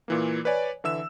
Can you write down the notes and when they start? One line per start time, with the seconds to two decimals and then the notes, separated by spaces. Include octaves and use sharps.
0.08 A#2 E3 A#3
0.45 B4 C#5 D5 G#5
0.84 D3 E3 E5 E6 E7